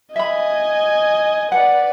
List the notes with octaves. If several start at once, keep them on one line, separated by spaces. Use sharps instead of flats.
D#5 E5 G#5 B5
B4 D5 F#5